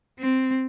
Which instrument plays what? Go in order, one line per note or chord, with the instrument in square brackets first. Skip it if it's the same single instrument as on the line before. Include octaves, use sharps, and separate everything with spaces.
[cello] C4